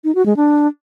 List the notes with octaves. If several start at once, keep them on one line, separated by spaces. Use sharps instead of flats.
D#4
F#4
G#3
D4